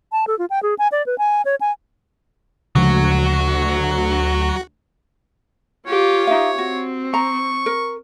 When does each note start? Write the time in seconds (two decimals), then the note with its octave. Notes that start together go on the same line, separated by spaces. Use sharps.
0.12 A5
0.27 A4
0.39 F4
0.50 G5
0.63 G#4
0.79 G#5
0.92 D5
1.06 B4
1.18 G#5
1.45 C#5
1.61 G#5
2.75 D2 C#3 F3 F#3 G#3 F#4
5.87 F4 G4 C#5
6.27 D#4 E5 F5
6.58 C4 F#4
7.14 A#5 C#6
7.66 A#4